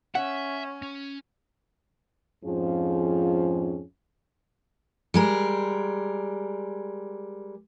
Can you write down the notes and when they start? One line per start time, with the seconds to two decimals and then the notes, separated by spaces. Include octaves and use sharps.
0.15 C#4 E5 F#5
0.82 C#4
2.44 F2 G#2 F3 C#4 F4 G#4
5.14 G3 G#3 A#4